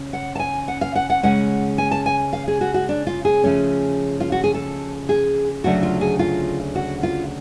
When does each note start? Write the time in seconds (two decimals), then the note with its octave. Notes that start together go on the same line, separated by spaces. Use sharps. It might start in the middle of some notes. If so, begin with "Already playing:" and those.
Already playing: C#3 C#4
0.13 F#5
0.35 A5
0.40 G#5
0.68 F#5
0.81 F5
0.96 F#5
1.10 F#5
1.23 C#3 G#3 C#4 F#5
1.78 G#5
1.91 A5
2.06 G#5
2.33 F5
2.48 G#4
2.61 F#4
2.74 F#4
2.89 D4
3.07 F4
3.25 G#4
3.44 C#3 F3 A3 C#4
4.20 F4
4.32 F#4
4.44 G#4
4.54 A4
5.09 G#4
5.64 D2 C#3 F#3 A3 D4 F#4
5.83 F4
6.01 G#4
6.19 F4
6.75 F#4
7.03 F4